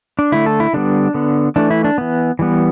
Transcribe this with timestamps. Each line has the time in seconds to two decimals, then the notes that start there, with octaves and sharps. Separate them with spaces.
0.19 D4
0.32 D3 A3 E4
0.46 A4
0.60 E4
0.74 D3 G3 B3 D4
1.14 D3 B3
1.56 E3 A3 D4
1.71 E4
1.84 D4
1.98 E3 B3
2.39 E3 G3 B3